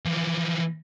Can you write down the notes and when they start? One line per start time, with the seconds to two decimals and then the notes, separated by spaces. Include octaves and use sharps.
0.05 E3 F3